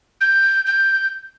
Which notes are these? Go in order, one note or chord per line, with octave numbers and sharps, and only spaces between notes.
G6
G6